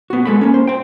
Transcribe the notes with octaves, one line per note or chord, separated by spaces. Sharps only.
B3 F#4
G#3 A4 B5
A#3 C#4
C5
C5 G5